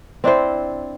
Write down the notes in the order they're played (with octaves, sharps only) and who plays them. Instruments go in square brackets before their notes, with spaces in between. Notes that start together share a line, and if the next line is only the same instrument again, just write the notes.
[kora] C4 D4 E4 C5